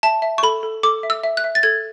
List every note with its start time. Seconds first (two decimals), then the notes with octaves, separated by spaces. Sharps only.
0.03 E5 A5
0.22 E5
0.38 C#6
0.43 A4 B5
0.63 A4
0.83 A4 D6
1.03 E5
1.10 E6
1.24 E5
1.37 F#6
1.44 E5
1.55 A6
1.63 A4 G#6